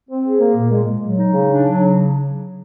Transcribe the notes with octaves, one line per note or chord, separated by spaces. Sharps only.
C4
G#4
A#3
A#2
G#3
G#3
F#3
D#4
C#3
D4
F#3
C#3